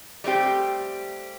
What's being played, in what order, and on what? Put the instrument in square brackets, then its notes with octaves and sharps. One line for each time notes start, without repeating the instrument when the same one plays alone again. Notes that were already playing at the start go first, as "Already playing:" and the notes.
[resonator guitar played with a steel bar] G3 A3 C4 G4